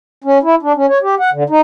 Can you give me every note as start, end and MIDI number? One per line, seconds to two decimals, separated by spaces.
0.24 0.38 61
0.43 0.55 64
0.63 0.73 62
0.76 0.86 61
0.89 0.98 73
1.03 1.15 67
1.20 1.30 78
1.33 1.43 50
1.50 1.61 63